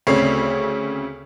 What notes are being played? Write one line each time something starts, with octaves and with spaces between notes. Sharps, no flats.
D2 C#3 C4 C#5 C7